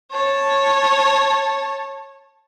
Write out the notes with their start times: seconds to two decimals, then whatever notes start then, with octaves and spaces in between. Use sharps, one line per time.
0.12 C#5 A5